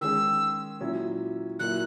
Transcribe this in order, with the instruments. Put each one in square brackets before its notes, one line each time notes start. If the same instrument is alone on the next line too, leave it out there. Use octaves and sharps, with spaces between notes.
[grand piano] D#3 G#3 C#4 G#4 [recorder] E6
[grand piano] A#2 F#3 C#4 E4
[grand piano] A#2 F#3 A#3 E4 [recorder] F#6